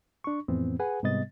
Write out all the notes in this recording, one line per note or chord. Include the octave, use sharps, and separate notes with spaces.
D4 C#6
F2 A2 E3 B3 C4
G#4 B4 F#5 G#5
G#2 C3 G3 B3 D#5 A6